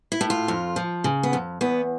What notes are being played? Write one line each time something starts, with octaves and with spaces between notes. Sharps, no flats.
E4
A2
F4
F2
F3
C#3
B3
F2
E2 B3